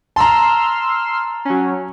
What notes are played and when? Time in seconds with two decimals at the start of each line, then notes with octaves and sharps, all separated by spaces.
0.16 A5 A#5 C6 E6 F6
1.45 F#3 C#4